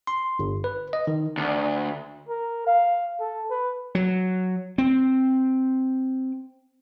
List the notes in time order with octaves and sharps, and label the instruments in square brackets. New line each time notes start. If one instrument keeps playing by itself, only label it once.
[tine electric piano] C6
G1
B4
D#5
D#3
[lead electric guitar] D2
[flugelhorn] A#4
F5
A4
B4
[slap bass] F#3
C4